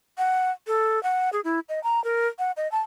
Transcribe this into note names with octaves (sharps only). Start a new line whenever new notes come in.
F#5
A4
F#5
G#4
E4
D#5
A#5
A#4
F#5
D#5
A5